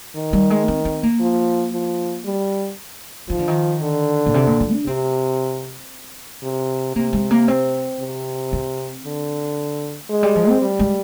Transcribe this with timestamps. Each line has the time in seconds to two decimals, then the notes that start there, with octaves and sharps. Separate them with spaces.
0.16 D#3
0.33 G3
0.50 G#3
0.68 C4
0.85 C4
1.03 A#3
1.20 F3
1.72 F3
2.25 G3
3.29 D#3 F3
3.39 D3
3.48 D#3
3.82 D3
4.26 A#2
4.34 C3
4.47 A#2
4.60 F3
4.73 D4
4.86 C3 C4
6.43 C3
6.96 C3 A#3
7.13 G#3
7.31 A#3
7.48 C4
8.00 C3
8.53 C4
9.05 D3
10.09 F3 G#3
10.23 G3
10.36 F3
10.49 C4
10.61 G3
10.79 G#3